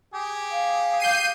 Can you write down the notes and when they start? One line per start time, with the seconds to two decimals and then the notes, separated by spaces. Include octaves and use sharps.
0.14 G4 G#4
0.52 F5
1.00 G6 C7 D#7